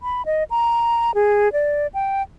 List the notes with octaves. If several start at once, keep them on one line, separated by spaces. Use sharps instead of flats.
B5
D#5
A#5
G#4
D5
G5